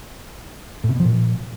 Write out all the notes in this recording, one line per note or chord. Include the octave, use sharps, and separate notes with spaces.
A2
C3
B2
F3
A#2